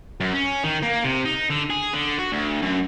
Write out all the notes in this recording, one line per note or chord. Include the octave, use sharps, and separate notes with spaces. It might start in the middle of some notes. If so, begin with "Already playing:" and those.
F#2
C#4
D#3
A#3
C3
D#4
D3
G#4
D3
F#4
D2
F#2